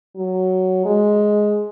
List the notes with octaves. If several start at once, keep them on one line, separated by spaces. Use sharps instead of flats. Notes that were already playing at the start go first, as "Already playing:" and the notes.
F#3
G#3